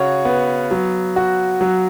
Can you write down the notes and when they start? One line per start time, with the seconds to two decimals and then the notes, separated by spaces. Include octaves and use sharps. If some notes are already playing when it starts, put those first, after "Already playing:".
Already playing: C#3 F#4 C#5
0.25 B3
0.71 F#3
1.16 F#4
1.61 F#3